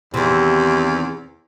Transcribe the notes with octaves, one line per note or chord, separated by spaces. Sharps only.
E2 C3 D#3